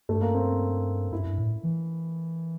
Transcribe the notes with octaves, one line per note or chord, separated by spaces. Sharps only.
G2 A3
A#3
C4
G2 E4
G2
A2
E3